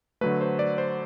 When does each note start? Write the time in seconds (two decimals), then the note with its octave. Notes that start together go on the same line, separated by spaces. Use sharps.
0.21 D3 F#3 A3 B4
0.41 C5
0.59 D5
0.78 C5